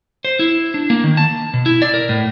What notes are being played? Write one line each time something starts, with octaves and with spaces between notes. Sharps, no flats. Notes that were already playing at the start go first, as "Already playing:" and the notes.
C5
E4
D4
A#3
D#3
A5
B2
E4
D5
A#4
A2